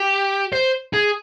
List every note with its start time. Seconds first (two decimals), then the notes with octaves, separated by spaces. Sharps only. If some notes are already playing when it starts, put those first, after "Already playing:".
Already playing: G4
0.52 C5
0.93 G#4